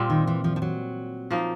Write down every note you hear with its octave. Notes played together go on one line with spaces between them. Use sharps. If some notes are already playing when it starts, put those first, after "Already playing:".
Already playing: A#2 G3 C4
D#3
E3
F3
F3
F#3
F3 A#3 D#4